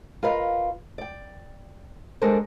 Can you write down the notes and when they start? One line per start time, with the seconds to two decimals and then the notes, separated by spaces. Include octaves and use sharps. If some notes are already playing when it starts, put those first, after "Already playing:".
0.23 F4 A#4 B4 D#5 F5
0.98 D5 G5
2.22 G3 G#3 D4 A4 A#4 C5